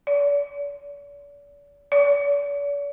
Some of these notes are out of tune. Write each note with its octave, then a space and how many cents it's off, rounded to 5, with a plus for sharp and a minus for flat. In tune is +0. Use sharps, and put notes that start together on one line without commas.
D5 -40
D5 -45